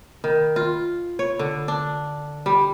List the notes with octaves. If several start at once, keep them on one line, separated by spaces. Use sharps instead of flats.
D#3
F4
C#5
D3
D4
G3